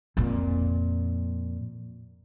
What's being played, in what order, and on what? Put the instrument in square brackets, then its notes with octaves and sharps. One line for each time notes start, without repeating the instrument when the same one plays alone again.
[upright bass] F2 A#2